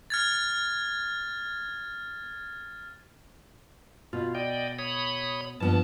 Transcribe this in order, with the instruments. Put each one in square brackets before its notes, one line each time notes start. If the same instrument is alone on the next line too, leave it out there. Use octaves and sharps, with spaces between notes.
[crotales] F6 G#6 A6
[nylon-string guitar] B2 [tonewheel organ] F4
[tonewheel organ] D5 D#5 G5
C#5 B5 D#6
[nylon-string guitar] G2 F3 B3 [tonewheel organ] A5